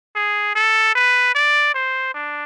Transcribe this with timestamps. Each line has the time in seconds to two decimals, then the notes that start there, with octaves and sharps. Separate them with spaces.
0.15 G#4
0.55 A4
0.95 B4
1.35 D5
1.75 C5
2.14 D4